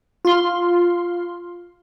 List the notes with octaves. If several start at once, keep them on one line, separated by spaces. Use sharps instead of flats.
F4 C6